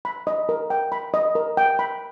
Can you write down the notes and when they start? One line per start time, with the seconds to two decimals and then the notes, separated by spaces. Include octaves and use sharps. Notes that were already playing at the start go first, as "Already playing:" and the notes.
0.05 B5
0.27 D#5
0.49 A#4
0.70 G5
0.92 B5
1.14 D#5
1.35 A#4
1.57 G5
1.79 B5